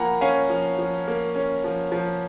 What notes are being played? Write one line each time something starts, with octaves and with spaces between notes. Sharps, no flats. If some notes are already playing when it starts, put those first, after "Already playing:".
Already playing: F3 A#3 F#5 G#5 A#5 B5
C#4 F5 G#5
F3
F3
A#3
C#4
F3
F3